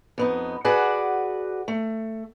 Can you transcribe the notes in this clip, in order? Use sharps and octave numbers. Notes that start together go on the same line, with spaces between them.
F2 B3 D#4
F#4 G#4 B4 D5 F#5
A3